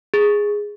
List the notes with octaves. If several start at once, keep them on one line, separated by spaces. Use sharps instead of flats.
G#4